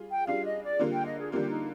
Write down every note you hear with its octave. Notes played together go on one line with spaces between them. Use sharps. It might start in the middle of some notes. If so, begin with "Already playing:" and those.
Already playing: G3 F4 G#4
G5
G3 D4 F4 G#4 F5
D#5
D5
D3 G3 A#3 F4
G5
D#5
G#4
D3 G3 A#3 F4 G4
D#4